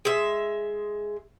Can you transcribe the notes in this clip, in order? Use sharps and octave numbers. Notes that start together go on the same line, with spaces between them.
G#3 E5